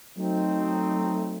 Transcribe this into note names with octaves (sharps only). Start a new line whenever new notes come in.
F#3 A3 C4 D#4